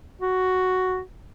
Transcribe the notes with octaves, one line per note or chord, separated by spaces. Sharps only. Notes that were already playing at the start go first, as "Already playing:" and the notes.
F#4